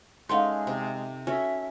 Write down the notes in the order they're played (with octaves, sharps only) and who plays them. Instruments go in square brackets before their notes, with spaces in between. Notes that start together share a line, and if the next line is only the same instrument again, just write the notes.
[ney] G#3 [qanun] A3 C#4 D#4 [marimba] F5 F#5 C6
[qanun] C3
[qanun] A3 C#4 F#4 [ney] E5